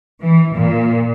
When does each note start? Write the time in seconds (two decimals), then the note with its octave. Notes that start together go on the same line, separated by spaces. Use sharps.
0.22 E3
0.54 A#2